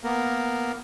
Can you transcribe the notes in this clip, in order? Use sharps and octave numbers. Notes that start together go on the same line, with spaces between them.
A#3 B3 A#4